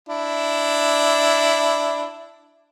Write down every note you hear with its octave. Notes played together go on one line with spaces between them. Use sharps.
D4 E4